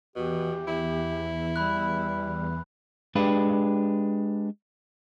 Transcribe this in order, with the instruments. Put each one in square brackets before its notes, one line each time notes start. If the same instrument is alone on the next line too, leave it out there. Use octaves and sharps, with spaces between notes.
[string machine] E2 E3 [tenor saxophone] B2 [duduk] G4
[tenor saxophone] E4
[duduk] G3 [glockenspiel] B5 F#6
[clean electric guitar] G#3 D4 G4 B4